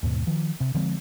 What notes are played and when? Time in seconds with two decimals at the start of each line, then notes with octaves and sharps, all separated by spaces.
0.03 D#2 G#2 B2
0.27 D#3 F3
0.60 C3
0.74 D3 F3 G#3 C4